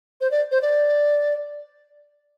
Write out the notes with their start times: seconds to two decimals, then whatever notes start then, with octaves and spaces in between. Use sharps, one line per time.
0.21 C5
0.31 D5
0.51 C5
0.62 D5